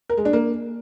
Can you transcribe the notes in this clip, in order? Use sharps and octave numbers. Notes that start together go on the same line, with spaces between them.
A#4
G#3
D4
A#3